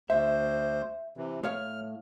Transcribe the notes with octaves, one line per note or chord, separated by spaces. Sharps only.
D2 C5 E5
C3 E3
A2 C#5 F5 F6